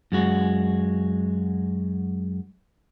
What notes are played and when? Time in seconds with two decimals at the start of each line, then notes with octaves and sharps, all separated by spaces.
0.12 F#2 G#3 F#4